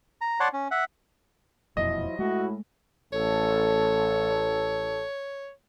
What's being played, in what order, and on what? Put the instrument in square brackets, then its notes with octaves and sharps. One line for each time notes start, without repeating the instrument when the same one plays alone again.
[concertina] A#5
C#5 D5 F#5 A5 C6
C#4
E5 F#5
[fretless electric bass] E1 F2 A#2 [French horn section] F3 F#3 E4 [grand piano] D#5
[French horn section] A2 E4 [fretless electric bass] G#3 A3 [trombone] F#4
[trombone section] A1 A4 [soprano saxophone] C#5